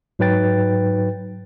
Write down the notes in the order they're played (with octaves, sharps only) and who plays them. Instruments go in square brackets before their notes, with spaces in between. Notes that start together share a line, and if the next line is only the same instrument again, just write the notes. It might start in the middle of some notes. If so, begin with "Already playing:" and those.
[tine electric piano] G#2 F#3 D#4 B4 G5 A6